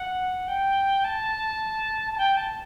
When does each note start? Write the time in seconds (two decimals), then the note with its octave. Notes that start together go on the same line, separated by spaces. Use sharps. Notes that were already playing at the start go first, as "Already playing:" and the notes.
Already playing: F#5
0.48 G5
1.04 A5
2.12 A5
2.18 G5
2.37 A5